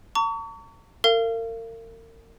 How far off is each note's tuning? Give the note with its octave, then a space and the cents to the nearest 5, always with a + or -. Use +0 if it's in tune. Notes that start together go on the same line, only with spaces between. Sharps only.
A#5 -45 C#6 +35
A#4 -40 F5 -35